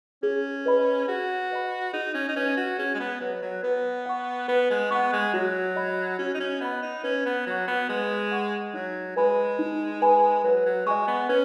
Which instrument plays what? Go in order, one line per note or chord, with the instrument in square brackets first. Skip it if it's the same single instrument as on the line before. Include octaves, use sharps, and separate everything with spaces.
[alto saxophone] C#4 [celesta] G#4
[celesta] B4 D#5 B5
[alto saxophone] F#4 [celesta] G#4
[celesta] B4 D#5 B5
[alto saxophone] D#4 [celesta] G#4
[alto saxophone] C#4
D#4
[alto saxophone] C#4 [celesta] B4 D#5
[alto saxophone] F#4
[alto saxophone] C#4 [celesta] G#4
[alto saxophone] G#3
B3
[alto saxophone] F#3 [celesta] B4 D#5
[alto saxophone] F#3
[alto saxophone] B3 [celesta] B4
[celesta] F#5 C#6
[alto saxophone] B3 [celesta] B4
[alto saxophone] G#3
[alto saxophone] B3 [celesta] F#5 C#6
[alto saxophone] G#3
[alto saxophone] F#3 [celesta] F#4
[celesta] D#5 B5
[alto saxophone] C#4 [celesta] F#4
[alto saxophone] D#4
C#4
[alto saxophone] B3 [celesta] D#5 B5
[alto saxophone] D#4
[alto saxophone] C#4 [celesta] B4
[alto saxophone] B3
[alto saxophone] F#3 [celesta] F#5 C#6
[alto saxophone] B3
[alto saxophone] G#3 [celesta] B4
[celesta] F#5 C#6
[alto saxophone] F#3 [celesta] D#4
[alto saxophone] G#3 [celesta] B4 G#5 B5
[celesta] D#4
B4 G#5 B5
[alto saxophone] F#3 [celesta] B4
[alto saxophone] F#3
[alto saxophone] G#3 [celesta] D#5 G#5 C#6
[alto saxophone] B3
[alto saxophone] C#4 [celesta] B4